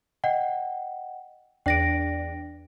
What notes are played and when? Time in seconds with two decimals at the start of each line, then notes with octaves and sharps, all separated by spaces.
0.24 D#5 F#5 G5
1.66 E2 D4 D5 G5 A#6 D7